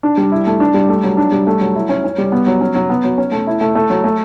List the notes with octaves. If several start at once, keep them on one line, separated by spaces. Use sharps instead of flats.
D4
G3
E4
A3
D4
G3
A3
F#3
D4
G3
A3
F#3
E4
C#4
C#4
G3
B3
F#3
C#4
F#3
B3
F#3
C#4
A3
E4
A3
A3
F#3
A3